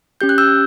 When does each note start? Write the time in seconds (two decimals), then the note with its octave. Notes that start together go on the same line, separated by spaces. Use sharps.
0.21 C#4 G4 G6
0.29 F#6
0.38 E6 G6